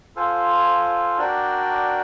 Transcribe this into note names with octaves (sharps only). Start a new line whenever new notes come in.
F4 A4 C5 F5 G#5
D4 F#4 A#4 D5 G5